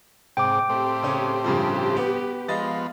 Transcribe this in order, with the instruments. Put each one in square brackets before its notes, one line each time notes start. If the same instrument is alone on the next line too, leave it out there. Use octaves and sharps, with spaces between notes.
[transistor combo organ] G#2 C3 [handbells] G5 D6
[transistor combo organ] A2 C4 [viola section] G4
[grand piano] C#3 C#4
[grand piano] G2 C#3 F3 [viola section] G4
[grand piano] B3
[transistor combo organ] F3 B3 [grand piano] G#3 D#5 A6